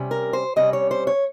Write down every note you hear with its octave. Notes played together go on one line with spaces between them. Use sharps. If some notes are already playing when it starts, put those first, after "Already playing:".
Already playing: C3 G3 C#4
A#4
C5
C3 G3 C#4 D#5
C#5
C5
C#5